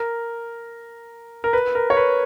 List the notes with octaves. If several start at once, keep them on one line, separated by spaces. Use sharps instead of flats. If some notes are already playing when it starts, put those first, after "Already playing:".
Already playing: A#4
A#4
B4
A#4
C#5
B4